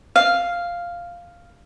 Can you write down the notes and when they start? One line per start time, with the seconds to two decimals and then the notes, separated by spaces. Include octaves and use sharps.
0.16 F5